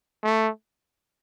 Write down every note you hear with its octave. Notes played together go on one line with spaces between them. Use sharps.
A3